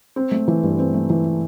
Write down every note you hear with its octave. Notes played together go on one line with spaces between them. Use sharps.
C4
A3
E3
G2
C4
A3
E3